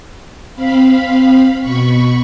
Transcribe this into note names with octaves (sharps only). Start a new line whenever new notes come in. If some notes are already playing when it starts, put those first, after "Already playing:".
C4 F5 B5
B2 B5 C#6